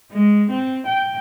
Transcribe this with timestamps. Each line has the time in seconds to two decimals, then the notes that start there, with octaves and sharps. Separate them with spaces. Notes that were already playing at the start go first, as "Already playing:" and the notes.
0.12 G#3
0.50 C4
0.87 G5